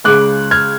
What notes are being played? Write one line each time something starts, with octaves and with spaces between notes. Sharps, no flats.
C#2 C#3 G#3 D6 F#6
F6 G#6